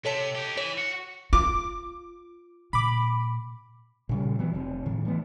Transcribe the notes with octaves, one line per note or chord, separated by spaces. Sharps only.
C3 A4 C#5 A5
D#4 G4
E3 C#5
F#4
F4 D6
A#2 B5 D6
A#2 C#3 G3
E3 F#3 B3
F1 F2
A2 D#3
E3 A3 B3